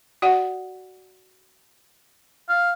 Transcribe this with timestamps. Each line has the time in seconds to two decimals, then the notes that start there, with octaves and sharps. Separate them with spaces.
0.22 F#4 D5 F#5
2.49 F5